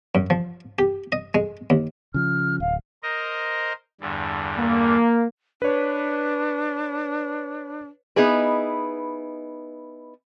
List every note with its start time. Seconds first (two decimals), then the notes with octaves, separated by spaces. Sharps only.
0.15 F#2
0.30 F3
0.79 G4
1.12 D#5
1.35 G#3
1.70 D#2
2.14 C#3 F3 F6
2.60 D1 F5
3.03 A#4 C5 D#5
4.01 E2 G2 D3
4.59 A#3
5.62 D4 B4 C#5
8.16 B3 D#4 E4 G#4 B4